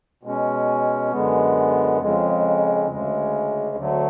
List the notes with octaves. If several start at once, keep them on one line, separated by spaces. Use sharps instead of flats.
B2 G#3 C#4
F#2 D3 G#3 B3
F2 C#3 G#3
D2 C#3 G#3
D2 D3 F#3 A3